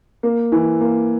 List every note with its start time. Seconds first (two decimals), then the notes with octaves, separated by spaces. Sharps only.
0.23 A#3
0.52 E3
0.81 A#3